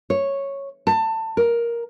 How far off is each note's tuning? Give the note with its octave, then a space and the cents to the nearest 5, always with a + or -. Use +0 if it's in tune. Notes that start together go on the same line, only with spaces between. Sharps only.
C#5 -5
A5 +20
A#4 +10